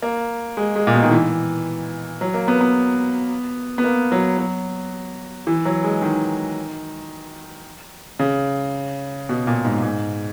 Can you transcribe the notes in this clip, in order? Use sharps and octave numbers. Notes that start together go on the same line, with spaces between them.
A#3
G#3
G#3
A#2
B2
D#3
E3
F#3
A#3
B3
B3
B3
A#3
F#3
F#3
E3
F#3
G#3
D#3
C#3
B2
A#2
G#2
G#2